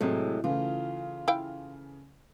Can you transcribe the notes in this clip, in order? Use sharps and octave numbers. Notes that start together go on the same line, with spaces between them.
A2 C3 F#3 G#3 A3 C4
C#3 E3 A3 F4
E4 F5 G5